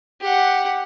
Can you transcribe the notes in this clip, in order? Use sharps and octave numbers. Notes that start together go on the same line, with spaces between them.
G4 F#5